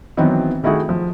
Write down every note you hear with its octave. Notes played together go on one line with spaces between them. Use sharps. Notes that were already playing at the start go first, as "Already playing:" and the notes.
D#3 E3 F#3 B3 C4
D#3 A3 E4 F#4 G#4
F3